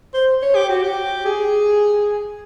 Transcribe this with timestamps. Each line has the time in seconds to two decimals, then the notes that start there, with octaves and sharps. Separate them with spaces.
0.14 C5
0.42 C#5
0.56 G4
0.69 F#4
0.82 G4
1.26 G#4